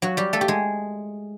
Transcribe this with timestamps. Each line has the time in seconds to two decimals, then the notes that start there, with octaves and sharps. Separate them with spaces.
0.02 F#3 F#4
0.17 G3 G4
0.33 A3 A4
0.41 G4
0.48 G#3 G#4